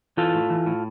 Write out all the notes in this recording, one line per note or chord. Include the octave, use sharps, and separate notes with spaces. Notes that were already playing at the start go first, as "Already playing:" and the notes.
E3 F4 A4
A2
E3
A2